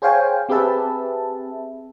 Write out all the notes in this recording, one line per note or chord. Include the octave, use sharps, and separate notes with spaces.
G#4 C5 C#5 F5 G5 G#5
C4 G4 G#4 B4 E5 A5